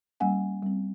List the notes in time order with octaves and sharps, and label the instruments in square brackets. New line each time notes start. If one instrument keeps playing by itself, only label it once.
[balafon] G3 A#3 C#4 F#5 G#5
G3 C4